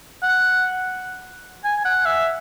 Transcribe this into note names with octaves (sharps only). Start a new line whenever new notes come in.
F#5
G#5
F#5
E5